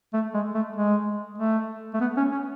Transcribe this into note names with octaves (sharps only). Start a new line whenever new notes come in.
A3
G#3
A3
G#3
A3
A3
B3
C#4
C#4